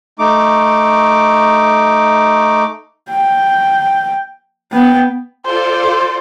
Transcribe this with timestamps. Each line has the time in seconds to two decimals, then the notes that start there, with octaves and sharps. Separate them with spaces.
0.19 A3 D#4 D6
3.10 G5
4.72 B3 G5
5.45 F4 A4 C5 D5